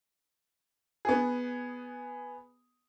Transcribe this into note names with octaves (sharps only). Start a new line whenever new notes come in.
B3 G#4